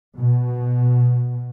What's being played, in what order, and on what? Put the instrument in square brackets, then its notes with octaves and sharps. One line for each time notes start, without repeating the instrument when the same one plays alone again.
[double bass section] B2